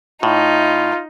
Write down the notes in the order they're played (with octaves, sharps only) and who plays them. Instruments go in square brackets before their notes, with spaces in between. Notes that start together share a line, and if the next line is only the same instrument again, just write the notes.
[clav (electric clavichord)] A2 [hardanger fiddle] D#4 [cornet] F4